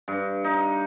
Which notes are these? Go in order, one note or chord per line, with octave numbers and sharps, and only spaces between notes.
G2
D#4